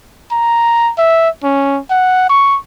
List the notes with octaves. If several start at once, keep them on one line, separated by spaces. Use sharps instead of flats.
A#5
E5
C#4
F#5
C#6